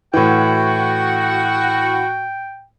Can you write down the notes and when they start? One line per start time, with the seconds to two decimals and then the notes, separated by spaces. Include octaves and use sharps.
0.14 A2 E3 F#4 G5